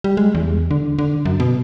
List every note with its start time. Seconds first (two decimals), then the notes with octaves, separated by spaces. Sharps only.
0.04 G3
0.17 G#3
0.35 E2
0.71 D3
0.99 D3
1.25 F#2
1.40 B2